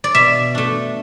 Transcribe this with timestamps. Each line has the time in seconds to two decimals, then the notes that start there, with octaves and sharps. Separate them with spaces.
0.04 D5
0.15 B2 E5
0.55 A3 D4